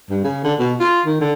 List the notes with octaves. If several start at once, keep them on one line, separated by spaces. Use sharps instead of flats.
G2
C#3
D3
B2
F4
D#3
D3